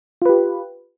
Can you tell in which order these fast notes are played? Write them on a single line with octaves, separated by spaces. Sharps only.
F4 B4 G4